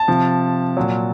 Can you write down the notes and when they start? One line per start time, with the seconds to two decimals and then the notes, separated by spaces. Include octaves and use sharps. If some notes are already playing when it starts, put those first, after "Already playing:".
Already playing: A5
0.08 C3 F3
0.77 A#2 F#3